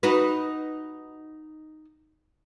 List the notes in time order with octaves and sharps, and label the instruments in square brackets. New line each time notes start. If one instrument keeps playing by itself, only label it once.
[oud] D#4 F#4 B4